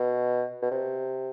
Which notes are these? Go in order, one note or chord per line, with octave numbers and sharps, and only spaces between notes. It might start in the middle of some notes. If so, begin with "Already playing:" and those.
Already playing: B2
B2
C3